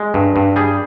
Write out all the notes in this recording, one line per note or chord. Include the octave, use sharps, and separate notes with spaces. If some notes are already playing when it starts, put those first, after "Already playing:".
Already playing: G#3
G2
G2
G3 G#4